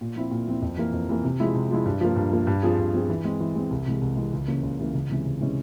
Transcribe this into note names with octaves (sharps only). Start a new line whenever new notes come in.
A#2
F3 C4 E4
A#2
F3 C4 E4
F2
E3 A#3
F2
E3 A#3
C3
F3 G#3 E4
C3
F3 G#3 E4
G2
F3 A#3
G2
F3 A#3
G2
F3 C4 F4 G#4
G2
F3 C4 F4 G#4
E3
G#3 C4
E3
G#3 C4
C2
C3 E3 G#3
C2
C3 E3 G#3
C#2
C#3 E3 A#3 C#4
C#2
C#3 E3 A#3 C#4
C#2
C3 E3 G#3 C#4
C#2
C3 E3 G#3 C#4